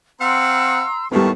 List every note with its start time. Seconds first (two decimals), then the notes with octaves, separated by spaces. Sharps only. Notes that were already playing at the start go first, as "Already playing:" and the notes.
0.20 C4 F5 F#5 A#5 C6 E6
1.12 D#2 A2 G3 B3 A5 C#6